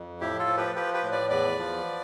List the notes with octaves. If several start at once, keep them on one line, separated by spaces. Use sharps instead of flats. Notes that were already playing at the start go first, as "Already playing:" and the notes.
Already playing: F2
A2 E4 G4
F4 A4
F3
G4 B4
F3 G4 B4
G4 B4
A2
B4 D5
E2 B4 D5
F3